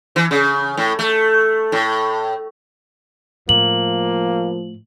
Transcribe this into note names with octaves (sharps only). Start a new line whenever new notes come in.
E3
C#3
A2
A3
A2
A2 F3 A#3 F#7